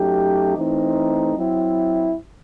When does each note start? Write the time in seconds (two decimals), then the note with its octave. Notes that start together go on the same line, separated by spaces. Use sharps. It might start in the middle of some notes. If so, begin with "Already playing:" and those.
Already playing: F#2 F#3 A3 D#4 G4
0.56 E3 A3 C4 D#4
1.37 F#3 C4 E4